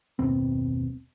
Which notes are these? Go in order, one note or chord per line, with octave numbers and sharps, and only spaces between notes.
F#1 D#2 B2 C4